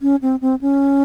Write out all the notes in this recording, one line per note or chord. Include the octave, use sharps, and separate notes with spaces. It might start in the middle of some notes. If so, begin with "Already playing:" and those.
C#4
C4
C4
C#4